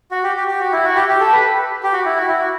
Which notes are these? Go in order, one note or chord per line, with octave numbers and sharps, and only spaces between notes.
F#4
G4
G4
G4
F#4
E4
F#4
G4
G4
A4
B4
G4
F#4
E4
F#4
E4
F#4